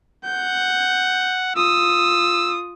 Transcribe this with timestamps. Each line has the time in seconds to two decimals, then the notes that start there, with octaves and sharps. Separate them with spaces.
0.25 F#5 G6
1.56 F4 D#6 E6